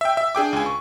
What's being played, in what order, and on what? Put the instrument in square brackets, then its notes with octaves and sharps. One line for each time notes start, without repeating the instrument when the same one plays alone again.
[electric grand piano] E5 G5
E5
D4 G#4 G5 D6
C#2 G#5
C#6